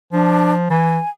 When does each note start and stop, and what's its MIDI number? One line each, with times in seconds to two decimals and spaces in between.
0.13 0.69 53
0.13 0.52 62
0.70 0.99 52
0.70 1.09 80